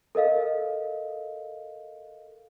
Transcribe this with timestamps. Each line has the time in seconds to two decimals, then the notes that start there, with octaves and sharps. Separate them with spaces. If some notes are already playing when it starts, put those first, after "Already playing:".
0.15 A4 A#4 D#5 F5